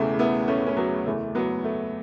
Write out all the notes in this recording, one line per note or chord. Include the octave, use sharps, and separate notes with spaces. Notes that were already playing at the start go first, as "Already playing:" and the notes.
Already playing: E1 E2 C#3 E3 A3
B3 E4
A3 C#4
C#4
F#3 B3
F#1 E2 E3 A3
F#3 B3
A3